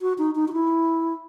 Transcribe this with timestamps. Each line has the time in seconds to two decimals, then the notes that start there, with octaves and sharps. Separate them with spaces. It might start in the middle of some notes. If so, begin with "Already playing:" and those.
0.01 F#4
0.18 D#4
0.35 D#4
0.48 F#4
0.53 E4